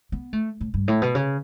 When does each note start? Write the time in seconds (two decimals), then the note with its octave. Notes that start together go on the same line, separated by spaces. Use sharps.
0.12 B3
0.33 A3
0.61 A2
0.74 G2
0.88 A2
1.02 B2
1.15 C#3